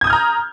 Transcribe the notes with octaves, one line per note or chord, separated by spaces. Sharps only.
A#5 D#6 F6 G6 G#6